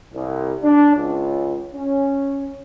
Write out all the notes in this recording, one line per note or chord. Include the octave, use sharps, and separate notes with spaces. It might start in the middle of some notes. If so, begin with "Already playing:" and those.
C2
D4
C#2
C#4